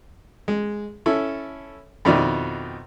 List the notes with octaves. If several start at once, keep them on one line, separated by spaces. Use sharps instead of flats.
G#3
C#4 E4 A4
F2 B2 D#3 E4 D5